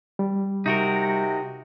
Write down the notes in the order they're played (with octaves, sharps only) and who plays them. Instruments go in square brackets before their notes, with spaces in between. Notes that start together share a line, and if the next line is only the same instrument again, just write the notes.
[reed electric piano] G3
[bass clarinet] C3 [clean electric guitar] D#4 F#4 A#4